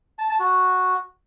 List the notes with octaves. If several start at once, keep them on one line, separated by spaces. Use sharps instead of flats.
A5
A5
F#4